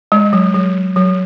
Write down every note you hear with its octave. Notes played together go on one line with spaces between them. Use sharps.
G#3
F#3
F#3
F#3